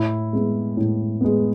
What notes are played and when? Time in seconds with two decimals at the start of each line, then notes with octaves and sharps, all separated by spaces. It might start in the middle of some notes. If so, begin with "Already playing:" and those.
Already playing: A2 E4
0.33 G#3 B3
0.77 A2
1.21 G#3 B3